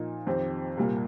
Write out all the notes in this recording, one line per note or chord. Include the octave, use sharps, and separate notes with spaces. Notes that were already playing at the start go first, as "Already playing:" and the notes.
Already playing: A#2 F3 A#3 D#4
F2 D#3 C4 G4 C5
C2 A#2 G3 A#3